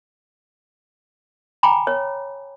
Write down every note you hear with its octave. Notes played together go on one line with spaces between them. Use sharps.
G5 G#5 A#5 B5 D6
C#5